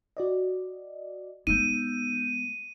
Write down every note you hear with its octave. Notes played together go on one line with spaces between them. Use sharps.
F#4 D5 D#5
G#3 B3 D#4 E6 G6 D#7